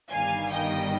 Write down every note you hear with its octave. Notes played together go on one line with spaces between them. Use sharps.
G1 G2 D#3 G3 F5 G#5
D#5 G5